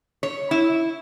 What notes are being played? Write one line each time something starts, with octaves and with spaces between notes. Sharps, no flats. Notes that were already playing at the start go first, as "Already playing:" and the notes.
C#5
E4